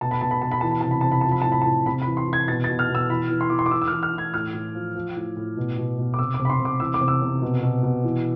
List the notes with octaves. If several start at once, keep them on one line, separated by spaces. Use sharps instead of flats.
B2 A5
B5
B2 A5
B5
B2 A5
B5
E3 A5
B5
C3 A5
B5
C3 A5
B5
F3 A5
B5
A2 A5
B5
A5
A2
C3 B5
B5
E3
C6
E3
G#6
B2 A6
A6
B2
F6
B2
E6
E3 B5
E3
C6
E3 D6
C6
D6
E3 E6
E6
F6
E3
F6
E3 G#6
A2 F6
A2
F3
F3
A2
A2
B2
B2
B2
D6
C3 E6
D6
C3
B5
C6
C3
D6
E3 E6
D6
C3
E6
C3
B2
B2
B2
E3